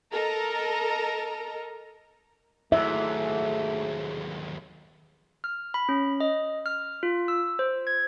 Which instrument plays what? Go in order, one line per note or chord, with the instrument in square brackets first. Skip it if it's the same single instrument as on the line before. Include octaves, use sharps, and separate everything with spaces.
[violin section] A4 A#4 D#5 A#5
[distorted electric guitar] D#2 F#3 [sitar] G#2 [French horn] A3 [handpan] E5
[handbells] F6
B5
C#4
D#5
F6
F4
E6
C5
G#6